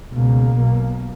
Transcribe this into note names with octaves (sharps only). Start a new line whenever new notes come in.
C#2 B2 A#3
B1 B2